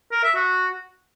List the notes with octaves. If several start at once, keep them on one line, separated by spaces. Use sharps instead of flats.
A#4
E5
F#4